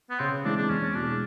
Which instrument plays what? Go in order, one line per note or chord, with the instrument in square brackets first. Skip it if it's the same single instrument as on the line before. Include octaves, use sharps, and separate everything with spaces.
[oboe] B3
[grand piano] C#3 [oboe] C4
[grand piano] E3 G#3 C4 [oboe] D4
[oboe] D4
[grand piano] E2 [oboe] C#4
[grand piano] B2 G#3 [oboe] D4